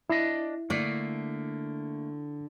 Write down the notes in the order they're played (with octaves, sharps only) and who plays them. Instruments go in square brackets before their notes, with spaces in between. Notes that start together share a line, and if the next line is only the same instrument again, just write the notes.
[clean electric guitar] D4 D#5 [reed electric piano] E4
[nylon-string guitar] D3 D5 [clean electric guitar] A3 A#3